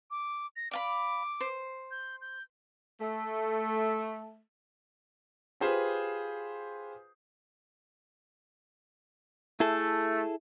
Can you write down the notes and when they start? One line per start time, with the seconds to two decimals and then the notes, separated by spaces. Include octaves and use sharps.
0.11 D6
0.56 A#6
0.71 D5 F5 B5 D6
1.41 C5
1.91 G6
2.21 G6
3.01 A3
5.60 F4 G4 G#4 B4 C5 D#6
9.60 A3 E4 G#4 A4